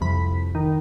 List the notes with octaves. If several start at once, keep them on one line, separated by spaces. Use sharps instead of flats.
C2 F2 B5
D#3